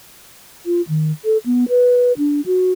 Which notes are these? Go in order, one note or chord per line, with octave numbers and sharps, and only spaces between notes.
F4
D#3
A4
B3
B4
D4
F#4